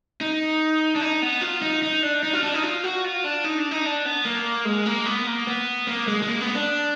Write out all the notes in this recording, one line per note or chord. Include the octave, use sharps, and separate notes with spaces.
D#4
D4
D#4
B3
F4
D#4
D#4
D4
D#4
F4
D4
D#4
F4
F#4
F4
D4
D#4
D4
D#4
D4
B3
A#3
G#3
A#3
B3
A#3
B3
A#3
G#3
G#3
A#3
B3
D4